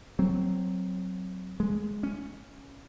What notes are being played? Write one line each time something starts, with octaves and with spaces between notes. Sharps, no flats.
F#3 C4
G#3
C#4